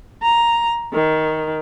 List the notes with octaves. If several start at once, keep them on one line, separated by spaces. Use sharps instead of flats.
A#5
D#3